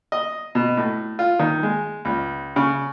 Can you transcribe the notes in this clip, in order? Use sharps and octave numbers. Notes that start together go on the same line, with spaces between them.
D#5
B2
A2
F4
D#3
G#3
C#2
C#3